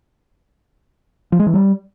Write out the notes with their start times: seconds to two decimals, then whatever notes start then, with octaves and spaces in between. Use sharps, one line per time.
1.32 F3
1.39 G#3
1.46 E3
1.54 G3